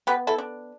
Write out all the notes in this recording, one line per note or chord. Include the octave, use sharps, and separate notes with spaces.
B3 G4 B4
E4 A4
D4